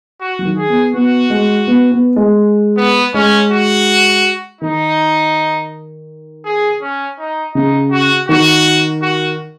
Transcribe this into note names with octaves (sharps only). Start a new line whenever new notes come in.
F#4
F#3
D#3
G#4
B3
B3 F#4
G#3
B3
B3
G#3
B3
G#3 C#4
F#4
D#3 D#4
G#4
C#4
D#4
C#3 D#4
F#4
D#3 F#4
F#4